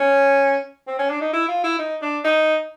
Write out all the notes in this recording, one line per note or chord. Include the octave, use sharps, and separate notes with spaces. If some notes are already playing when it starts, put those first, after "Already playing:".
Already playing: C#4
C4
C#4
D4
D#4
E4
F4
E4
D#4
D4
D#4